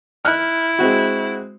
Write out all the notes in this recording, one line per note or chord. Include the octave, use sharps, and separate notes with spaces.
E4 F6 F#6
G#3 C4 F#4